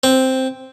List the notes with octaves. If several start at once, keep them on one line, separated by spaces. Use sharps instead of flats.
C4